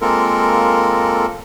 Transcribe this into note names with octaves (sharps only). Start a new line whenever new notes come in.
G#3 A#3 C4 F4 A4 A#4